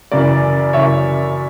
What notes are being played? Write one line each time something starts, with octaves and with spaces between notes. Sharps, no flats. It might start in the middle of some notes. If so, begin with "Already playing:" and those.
F#2 C#3 E3 D5
F#2 C#3 E3 C#5 E5